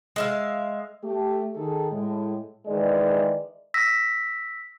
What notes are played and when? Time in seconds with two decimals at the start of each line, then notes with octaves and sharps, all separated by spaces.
0.16 G#3 E5 F5
1.04 A3 G4
1.55 D#3 G#4 A4
1.92 A2 G#3
2.67 D#3 E3 G#3 D5
3.74 E6 A#6 B6